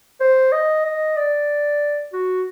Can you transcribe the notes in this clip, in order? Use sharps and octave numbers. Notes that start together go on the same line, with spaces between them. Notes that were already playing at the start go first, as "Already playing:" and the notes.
C5
D#5
D#5
D5
F#4